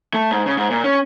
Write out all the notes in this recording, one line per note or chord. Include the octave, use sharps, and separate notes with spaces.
A3
G#2
C#3
G#2
A#2
C#4